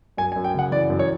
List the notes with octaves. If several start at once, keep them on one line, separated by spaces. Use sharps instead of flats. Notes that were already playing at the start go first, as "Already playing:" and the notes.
F#2 G#5
G#5
F#2
G5
C#3 F#5
E3 D5
F#2
C#5